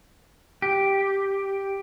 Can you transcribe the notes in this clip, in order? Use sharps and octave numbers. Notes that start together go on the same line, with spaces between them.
G4